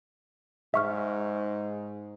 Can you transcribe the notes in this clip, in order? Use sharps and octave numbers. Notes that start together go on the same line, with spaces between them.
G#2 E5 C#6 F6